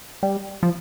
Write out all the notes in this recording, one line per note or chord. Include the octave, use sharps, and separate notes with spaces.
G3
F3